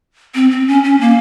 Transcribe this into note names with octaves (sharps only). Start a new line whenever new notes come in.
C4
C4
C#4
C#4
A#3